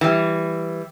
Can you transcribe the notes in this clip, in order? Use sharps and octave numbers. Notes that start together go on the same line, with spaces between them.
E3 G3